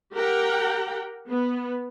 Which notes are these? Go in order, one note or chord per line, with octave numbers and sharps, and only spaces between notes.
G4 A#4 F#5 G5 A#5
B3